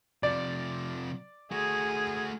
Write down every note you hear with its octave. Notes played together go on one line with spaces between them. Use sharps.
C3 F3 D5
A3 F#4 G#4